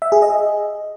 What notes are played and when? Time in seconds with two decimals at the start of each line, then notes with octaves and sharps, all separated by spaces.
0.02 E5
0.12 G#4
0.22 D#5